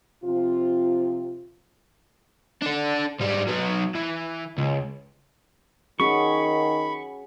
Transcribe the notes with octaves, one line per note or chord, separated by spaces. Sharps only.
C3 F3 C4 F4
D4 A4
G#2 G3
F#3 B3
E3
C#2
D#3 C#4 F#4 G#4 B5 C#6